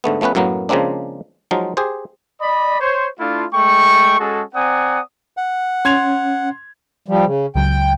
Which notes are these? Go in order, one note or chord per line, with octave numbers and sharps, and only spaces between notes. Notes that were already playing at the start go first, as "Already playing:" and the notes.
G#2 D3 A3 B3
F3 A3 B3 C#4 B4
F#2 A2 F#3 A#3 B3
C#3 F3 G#3 A#3 C4 D4
F3 F#3 G#3 D#4 F4
G4 G#4 C5
D5 D#5 B5
C5 C#5
A3 D4 E4 F4
G#3 A3 G5 C#6
G#3 C#4 F#4 G#4 A4
C4 D5 F#5 G#5 A#5 D#6
F#5
C#4 C6 G#6 F7
F3 G3
C#3
C#2 F#3 G5